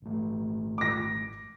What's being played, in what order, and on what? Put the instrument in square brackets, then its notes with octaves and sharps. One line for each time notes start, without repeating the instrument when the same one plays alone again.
[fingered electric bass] G#1 A3
[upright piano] D6 A#6